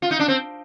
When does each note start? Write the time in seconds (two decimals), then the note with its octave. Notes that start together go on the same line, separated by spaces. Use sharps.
0.02 F4
0.11 D#4
0.20 D4
0.28 C4